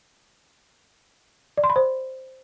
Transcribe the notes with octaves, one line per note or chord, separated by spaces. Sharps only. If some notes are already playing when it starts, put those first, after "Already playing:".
D5
C6
B5
C5